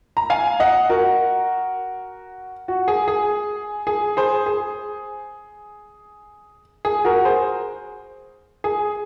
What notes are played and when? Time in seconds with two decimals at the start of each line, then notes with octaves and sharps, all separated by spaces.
0.17 A#5
0.30 F5 G#5
0.60 D#5 F#5
0.90 F#4 A#4
2.68 F#4
2.88 G#4
3.08 G#4
3.87 G#4
4.17 G#4 C5
4.46 G#4
6.85 G#4
7.05 F#4 A#4
7.25 G#4 C5
8.64 G#4